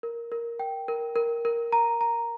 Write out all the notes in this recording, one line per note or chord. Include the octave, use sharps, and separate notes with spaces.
A#4
A#4
G5
A#4
A#4
A#4
A#5
A#5